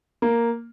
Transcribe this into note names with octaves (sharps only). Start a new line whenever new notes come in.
A#3